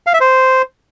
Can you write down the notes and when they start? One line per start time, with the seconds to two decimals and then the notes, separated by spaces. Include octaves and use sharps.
0.07 F5
0.14 E5
0.20 C5